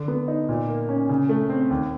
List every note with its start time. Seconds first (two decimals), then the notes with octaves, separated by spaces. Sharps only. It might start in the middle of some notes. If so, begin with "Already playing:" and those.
Already playing: D3
0.08 B3
0.28 D#4
0.49 A#2
0.69 A#3
0.89 C#4
1.09 C#3
1.29 A3
1.49 C4
1.70 D#2